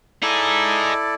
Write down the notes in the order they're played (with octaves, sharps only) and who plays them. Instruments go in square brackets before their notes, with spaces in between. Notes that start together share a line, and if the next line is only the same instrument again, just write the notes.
[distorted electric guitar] D#4 G#4 [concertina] E4 A4 D5